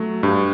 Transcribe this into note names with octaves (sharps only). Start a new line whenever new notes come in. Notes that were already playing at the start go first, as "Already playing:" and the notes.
Already playing: F#3 A3
G2